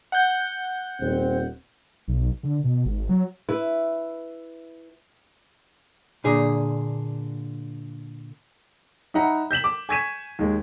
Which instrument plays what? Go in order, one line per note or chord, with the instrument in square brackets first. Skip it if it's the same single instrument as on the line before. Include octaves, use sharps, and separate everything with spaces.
[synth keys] F#5 G6
[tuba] D#1 [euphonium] C4
[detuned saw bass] B1
D3
B2
G#1
F#3
[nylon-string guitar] E4 B4
[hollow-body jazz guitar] A#2 D3 G#4
[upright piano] D#4 E5 F#5 A#5 B5
G6 B6 E7 F#7
D6
G#5 C#6 G#6 B6 D#7 E7
D#2 G#3